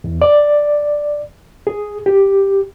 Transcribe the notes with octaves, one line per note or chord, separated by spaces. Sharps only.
E2
D5
G#4
G4